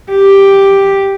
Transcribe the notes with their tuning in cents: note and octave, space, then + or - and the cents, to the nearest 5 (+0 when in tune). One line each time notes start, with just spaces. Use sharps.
G4 +0